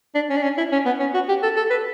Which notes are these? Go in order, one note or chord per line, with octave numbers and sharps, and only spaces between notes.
D4
C#4
D4
C#4
E4
C#4
B3
C#4
F#4
G4
A4
A4
B4